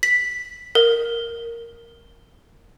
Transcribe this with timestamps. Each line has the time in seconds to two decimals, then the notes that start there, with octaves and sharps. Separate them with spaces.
0.03 B6
0.75 A#4